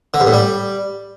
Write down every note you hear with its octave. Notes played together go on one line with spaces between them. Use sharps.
D3
G2
A2
G3